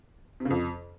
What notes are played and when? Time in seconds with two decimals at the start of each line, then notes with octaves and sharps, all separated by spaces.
0.40 C3
0.45 C#3
0.50 F2